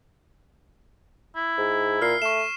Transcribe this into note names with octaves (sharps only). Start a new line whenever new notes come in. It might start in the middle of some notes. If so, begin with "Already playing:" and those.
E4
G#2
A#2 F6 C7
A3 C#6 E7